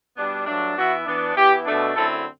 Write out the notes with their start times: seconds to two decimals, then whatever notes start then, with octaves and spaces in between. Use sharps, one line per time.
0.17 B2 G3 B3 D4
0.46 G2 F#3 A3 D4
0.76 E3 B3 E4 F#4
1.06 E3 B3 D4
1.36 E3 B3 E4 G4
1.65 B2 A3 D4
1.95 F#2 D3 A3 C4 E4 A4